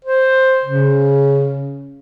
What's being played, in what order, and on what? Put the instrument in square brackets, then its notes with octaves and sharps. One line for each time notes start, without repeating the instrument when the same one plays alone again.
[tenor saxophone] C5
C#3